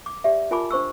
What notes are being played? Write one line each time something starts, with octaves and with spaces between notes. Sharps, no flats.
D6
G4 D5 E5
F4 A#4 G#5 A5 B5 D6
D4 C5 C#6 E6